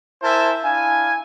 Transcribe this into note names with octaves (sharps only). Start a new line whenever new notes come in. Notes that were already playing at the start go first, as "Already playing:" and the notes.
E4 A#4 C5 E5 G#5 A5
D4 E4 F5 G#5